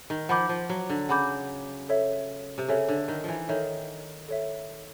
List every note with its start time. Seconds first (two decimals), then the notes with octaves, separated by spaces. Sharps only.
0.10 D#3
0.29 F3 F#5 B5 D6 G6
0.49 F3
0.69 F#3
0.90 D3
1.09 C#3 F#5 B5 D6 G6
1.89 A4 C#5 E5
2.58 C3
2.68 C#3 A4 C#5 E5
2.89 D3
3.08 D#3
3.24 E3 F3
3.48 D#3 A4 C#5 E5
4.29 A4 C#5 E5